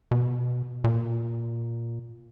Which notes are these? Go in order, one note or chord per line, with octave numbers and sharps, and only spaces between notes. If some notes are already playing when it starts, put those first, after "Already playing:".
B2
A#2